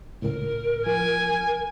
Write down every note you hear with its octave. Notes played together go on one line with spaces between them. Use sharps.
C#2 A2 A#4
F3 G#5